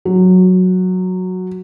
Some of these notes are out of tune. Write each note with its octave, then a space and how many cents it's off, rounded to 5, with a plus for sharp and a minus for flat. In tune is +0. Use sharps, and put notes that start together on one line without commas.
F#3 -5